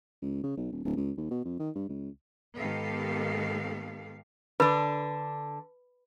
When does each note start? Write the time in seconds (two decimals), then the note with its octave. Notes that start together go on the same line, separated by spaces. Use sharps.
0.22 C#2
0.43 C#3
0.57 B1
0.72 D#1
0.85 D1
0.97 C#2
1.17 D#2
1.31 B2
1.45 F2
1.59 D#3
1.75 G2
1.89 C#2
2.58 G#2 D#3 B3 G4 A4 F5
4.60 D3 D4 B4 B5